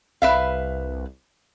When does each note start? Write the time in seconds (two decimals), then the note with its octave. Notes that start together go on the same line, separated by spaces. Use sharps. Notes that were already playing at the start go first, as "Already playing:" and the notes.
0.22 C2 B4 E5 F5